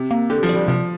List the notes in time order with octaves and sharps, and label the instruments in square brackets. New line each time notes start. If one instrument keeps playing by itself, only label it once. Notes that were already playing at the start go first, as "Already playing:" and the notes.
Already playing: [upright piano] C3
[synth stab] A#3
[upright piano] D3 [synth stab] G4
[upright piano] F3
[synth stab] D5
[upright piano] G3
[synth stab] C3 [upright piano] F3